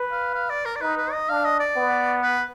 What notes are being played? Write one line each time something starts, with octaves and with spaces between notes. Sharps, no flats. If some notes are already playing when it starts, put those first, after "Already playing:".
Already playing: B4
F5
F5
D5
A#4
D5
D#4 B4
B4
D#5
D4 F5
D#5
D5
B3
B4